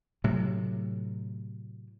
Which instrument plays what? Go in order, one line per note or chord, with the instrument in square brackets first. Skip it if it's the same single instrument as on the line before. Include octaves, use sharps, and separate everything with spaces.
[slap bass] A2 C3 F#3